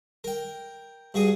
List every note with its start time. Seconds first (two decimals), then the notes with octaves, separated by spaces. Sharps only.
0.24 A#4 G5
1.14 G2 F#4 G#4 D#6